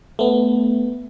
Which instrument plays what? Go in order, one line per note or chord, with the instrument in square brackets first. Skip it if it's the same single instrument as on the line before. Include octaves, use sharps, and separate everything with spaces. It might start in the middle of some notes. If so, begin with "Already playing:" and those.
[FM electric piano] A3 B3